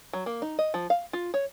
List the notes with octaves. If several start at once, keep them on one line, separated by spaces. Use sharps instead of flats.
F#3
A#3
D#4
D#5
F3
F5
F4
C#5